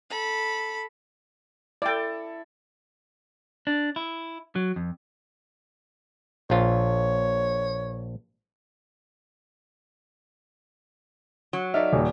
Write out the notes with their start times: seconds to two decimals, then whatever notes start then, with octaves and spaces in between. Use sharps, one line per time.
0.10 A4 B5
1.82 E4 A4 D5 G5
3.67 D4
3.96 E4
4.56 F#3
4.76 F2
6.50 A#1 F4 C#5
11.53 F#3
11.74 D#4 A4 D5 E5 F6
11.93 D#1